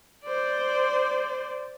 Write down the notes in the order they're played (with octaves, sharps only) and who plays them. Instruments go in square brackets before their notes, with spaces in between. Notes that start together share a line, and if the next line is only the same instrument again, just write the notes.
[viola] C5 D5